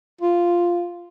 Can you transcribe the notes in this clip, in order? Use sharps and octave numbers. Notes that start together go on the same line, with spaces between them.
F4